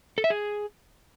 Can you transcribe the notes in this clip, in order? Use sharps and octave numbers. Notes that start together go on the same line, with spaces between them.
A4
E5
G#4